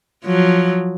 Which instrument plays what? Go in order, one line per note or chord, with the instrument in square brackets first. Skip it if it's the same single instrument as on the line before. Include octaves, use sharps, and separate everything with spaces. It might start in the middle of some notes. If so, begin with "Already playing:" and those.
[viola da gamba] F3 F#3